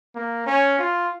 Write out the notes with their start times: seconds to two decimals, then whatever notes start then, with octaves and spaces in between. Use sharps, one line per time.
0.15 A#3
0.46 C#4
0.79 F4